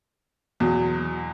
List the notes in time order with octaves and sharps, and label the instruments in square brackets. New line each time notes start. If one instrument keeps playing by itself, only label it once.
[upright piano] E2 B2 F#3